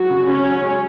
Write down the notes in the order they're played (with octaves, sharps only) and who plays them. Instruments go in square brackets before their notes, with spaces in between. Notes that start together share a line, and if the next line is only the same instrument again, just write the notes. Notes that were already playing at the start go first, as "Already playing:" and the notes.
Already playing: [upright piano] F#3 [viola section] F#4
[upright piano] C#3
[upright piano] C#3 [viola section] C#4
[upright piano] F#3
G#3